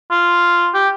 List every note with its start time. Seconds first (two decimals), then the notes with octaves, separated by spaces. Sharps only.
0.11 F4
0.74 G4